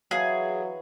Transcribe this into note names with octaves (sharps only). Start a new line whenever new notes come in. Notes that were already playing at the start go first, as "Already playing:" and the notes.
E3 F#3 F#4 G#4 F5 C#6